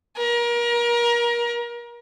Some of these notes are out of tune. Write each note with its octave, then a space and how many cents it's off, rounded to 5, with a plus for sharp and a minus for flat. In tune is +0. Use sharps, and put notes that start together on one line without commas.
A#4 +30